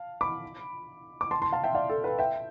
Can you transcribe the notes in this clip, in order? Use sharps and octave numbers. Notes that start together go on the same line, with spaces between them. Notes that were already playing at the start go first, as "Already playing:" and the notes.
Already playing: F5 A5
B5 D6
D6
A5 C6
A5 C6
F5 A5
E5 G5
D5 F5
A4
B4
E5 G5